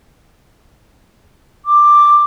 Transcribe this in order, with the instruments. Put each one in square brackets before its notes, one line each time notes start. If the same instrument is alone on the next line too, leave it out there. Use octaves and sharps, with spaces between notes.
[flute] D6